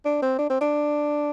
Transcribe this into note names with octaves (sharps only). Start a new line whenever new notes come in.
D4
C4
D4
C4
D4